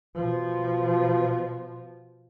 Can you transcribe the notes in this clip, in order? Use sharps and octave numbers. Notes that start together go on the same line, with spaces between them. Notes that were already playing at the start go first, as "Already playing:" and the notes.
B2 F3